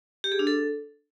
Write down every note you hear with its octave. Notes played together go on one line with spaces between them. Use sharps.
G4
G#4
D4
A4